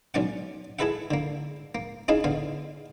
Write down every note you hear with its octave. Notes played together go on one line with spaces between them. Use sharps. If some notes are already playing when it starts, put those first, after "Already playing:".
B1 C#4 D5 F#5
E4 G#4 A4 B4 E5 F#5
D3 A#3
A#3
C#4 D#4 E4 G#4 E5 F5
D3 B3 F5